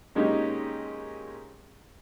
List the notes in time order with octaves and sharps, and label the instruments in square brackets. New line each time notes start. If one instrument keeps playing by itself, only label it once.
[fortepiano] A#2 G#3 C#4 D#4 G4